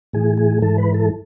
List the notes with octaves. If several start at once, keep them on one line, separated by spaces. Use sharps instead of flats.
A2 E3 G#4
G#4
G#2 E3 A4
B4
A4